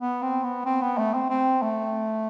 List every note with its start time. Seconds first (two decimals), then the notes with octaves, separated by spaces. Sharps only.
0.01 B3
0.22 C4
0.44 B3
0.65 C4
0.82 B3
0.98 A3
1.14 C4
1.30 C4
1.62 A3